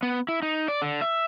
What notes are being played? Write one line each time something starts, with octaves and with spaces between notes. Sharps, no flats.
B3
E4
D#4
D5
D3
E5